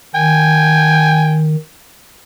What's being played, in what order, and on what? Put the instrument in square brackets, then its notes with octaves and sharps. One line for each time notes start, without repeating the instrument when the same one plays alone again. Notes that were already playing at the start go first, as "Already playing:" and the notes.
[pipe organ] D#3 [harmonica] G5 G#5